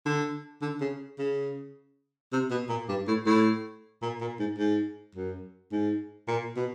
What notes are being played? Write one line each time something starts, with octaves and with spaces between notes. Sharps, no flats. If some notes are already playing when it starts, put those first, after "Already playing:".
D3
D3
C#3
C#3
C3
B2
A#2
G2
A2
A2
A#2
A#2
G#2
G#2
F#2
G#2
A#2
B2